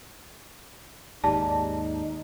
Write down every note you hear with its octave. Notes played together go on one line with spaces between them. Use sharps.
D#2 G#2 D#4 G4 D5 A5